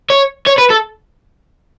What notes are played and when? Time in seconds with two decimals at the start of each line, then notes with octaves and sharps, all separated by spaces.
0.10 C#5
0.47 C#5
0.59 B4
0.71 A4